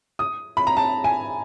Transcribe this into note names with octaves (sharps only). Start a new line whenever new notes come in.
D#6
B5
A#5
A5
G#5